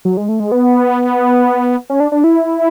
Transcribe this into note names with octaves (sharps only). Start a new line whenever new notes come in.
F#3
G#3
A3
G#3
B3
C#4
D4
D4
E4